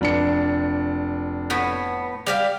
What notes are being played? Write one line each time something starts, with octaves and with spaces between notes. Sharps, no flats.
F1 D4 C#7
A2 B3
G3 G4 F5